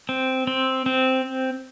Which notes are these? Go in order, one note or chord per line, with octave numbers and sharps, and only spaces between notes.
C4
C4
C4